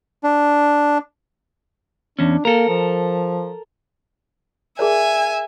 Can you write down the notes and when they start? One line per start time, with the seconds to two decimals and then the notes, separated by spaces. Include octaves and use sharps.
0.24 D4
2.19 E2 C#4 D4
2.45 A#3 A4 A#4
2.69 F3
4.79 G#4 A#4 D5 E5 G#5